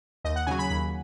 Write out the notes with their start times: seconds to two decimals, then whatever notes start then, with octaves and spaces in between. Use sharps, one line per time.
0.25 D#2 D#5
0.36 F#5
0.47 C#3 F#3 G#5
0.59 B5
0.70 D#2 B5